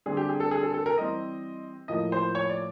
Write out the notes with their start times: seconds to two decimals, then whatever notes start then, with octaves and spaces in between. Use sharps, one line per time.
0.06 D3 G3 C4 G#4
0.17 G4
0.29 G#4
0.40 A4
0.51 G#4
0.63 A4
0.74 A4
0.86 A#4
0.98 E3 G3 C4 D#5
1.88 A2 F3 A#3 D#5
2.12 C5
2.35 C#5
2.49 D5